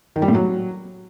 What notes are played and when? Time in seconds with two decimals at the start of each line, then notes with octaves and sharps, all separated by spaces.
0.16 D#3
0.22 G3
0.28 A2
0.35 F#3